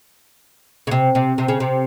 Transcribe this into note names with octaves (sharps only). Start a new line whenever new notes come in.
C#3
C3
C3
C3
C#3
C3